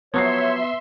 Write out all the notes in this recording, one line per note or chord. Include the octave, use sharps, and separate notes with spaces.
F3 F#3 B3 C#5 E5 C6 C7